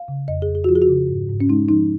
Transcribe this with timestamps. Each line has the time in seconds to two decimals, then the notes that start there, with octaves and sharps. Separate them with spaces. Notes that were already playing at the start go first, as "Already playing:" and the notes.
Already playing: F5
0.08 C#3
0.28 F2 D#5
0.42 G#4
0.49 F2
0.55 G#4
0.64 F#4
0.68 F3 F4
0.76 G#4
0.82 F#4
0.89 C#3
1.09 G#2
1.29 G#2
1.40 C#4
1.49 G#3 D#4
1.69 F3 D#4